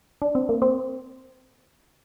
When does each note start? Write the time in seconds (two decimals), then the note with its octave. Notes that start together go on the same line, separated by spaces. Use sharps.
0.22 D4
0.35 C4
0.49 A#3
0.62 C4